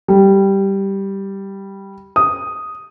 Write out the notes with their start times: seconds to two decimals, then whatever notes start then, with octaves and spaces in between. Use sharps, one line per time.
0.08 G3
2.16 D#6